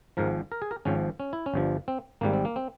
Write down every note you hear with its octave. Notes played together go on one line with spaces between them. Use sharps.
G#1 G#2 F3 A#4
A#4
G#4
A#4
G#1 G#2 F3 C#4
C#4
E4
C#4
G1 G2 F3
C4
G#1 G#2 G3 A#3
C4
A#3
C4